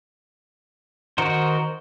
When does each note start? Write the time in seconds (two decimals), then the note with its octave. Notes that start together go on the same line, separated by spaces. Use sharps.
1.18 D#3 D#4 F#4 A#4 C5